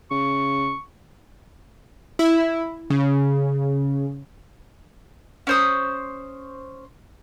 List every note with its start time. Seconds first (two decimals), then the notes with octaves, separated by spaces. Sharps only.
0.11 C#3 C#6
2.19 E4
2.90 C#3
5.47 C#4 C5 D#6